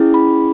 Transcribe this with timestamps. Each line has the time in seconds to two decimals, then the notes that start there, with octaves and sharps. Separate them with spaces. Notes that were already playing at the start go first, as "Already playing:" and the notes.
Already playing: C#4 E4 G#4
0.14 B5